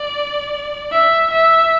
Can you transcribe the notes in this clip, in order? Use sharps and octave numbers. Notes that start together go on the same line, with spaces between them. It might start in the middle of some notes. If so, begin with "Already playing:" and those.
Already playing: D5
E5
E5